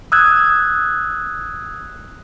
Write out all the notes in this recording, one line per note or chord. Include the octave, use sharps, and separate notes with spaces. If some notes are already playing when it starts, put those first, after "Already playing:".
D#6 E6 F#6 G#6